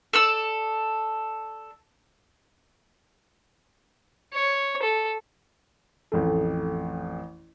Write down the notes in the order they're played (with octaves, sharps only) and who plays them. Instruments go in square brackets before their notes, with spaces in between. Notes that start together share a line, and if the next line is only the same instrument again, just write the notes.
[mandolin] A4 D5 E6
[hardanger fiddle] C#5
A4
[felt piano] A1 F2 A3